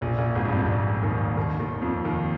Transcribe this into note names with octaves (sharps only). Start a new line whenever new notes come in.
A#1 A#2
A#1 A#2
G#1 G#2
G2
F2
G#2
G2
D#2 D#3
D#2 D#3
D#2 D#3
F2 F3
D#2 D#3